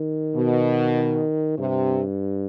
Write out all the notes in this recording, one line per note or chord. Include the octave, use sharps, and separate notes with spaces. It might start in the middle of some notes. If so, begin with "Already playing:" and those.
Already playing: D#3
B2
G2 C3